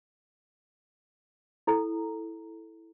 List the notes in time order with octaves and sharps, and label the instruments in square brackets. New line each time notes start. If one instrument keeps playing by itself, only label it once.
[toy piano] E4 A4 A#5